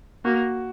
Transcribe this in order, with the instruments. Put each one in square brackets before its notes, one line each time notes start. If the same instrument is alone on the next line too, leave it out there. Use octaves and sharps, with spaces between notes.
[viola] A#3 [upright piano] F#4